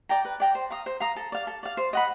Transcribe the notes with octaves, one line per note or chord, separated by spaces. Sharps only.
D5 G5 A#5
B4
D5 G5 A#5
C5
F5 A#5 D#6
C5
F5 A#5 D#6
A4
D5 F5
A4
D5 F5
C5
D#5 F#5 B5